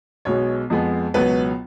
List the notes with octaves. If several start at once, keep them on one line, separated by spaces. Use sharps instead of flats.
B1 B2 G#3 B3 C#5
F2 F3 G#3 B3
C#2 B2 F#3 B3 B4